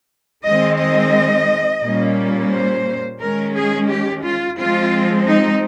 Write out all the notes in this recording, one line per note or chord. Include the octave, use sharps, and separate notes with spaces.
D#3 G#3 C4 D#5
D#5
A#2 G3 A#3 C#4
C5
D#3 G#3 C#4 A#4
G#4
G4
F4
F3 G#3 C4 F4
D#4